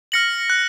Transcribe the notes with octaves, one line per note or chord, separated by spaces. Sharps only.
F6 A#6 C#7 F#7
F#6